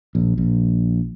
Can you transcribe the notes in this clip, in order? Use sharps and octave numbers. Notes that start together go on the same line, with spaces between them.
A#1
A#1